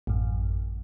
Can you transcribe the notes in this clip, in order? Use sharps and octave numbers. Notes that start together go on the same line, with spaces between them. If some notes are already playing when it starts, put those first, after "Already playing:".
A1 F#2